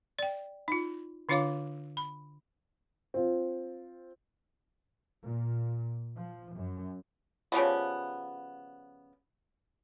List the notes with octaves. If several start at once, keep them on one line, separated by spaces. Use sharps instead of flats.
D5 G5
D#4 F4
D3 D4 F4 C#5 F5 D6
B5
C4 F4
A#2
F3
F#2
C#3 F3 G3 B3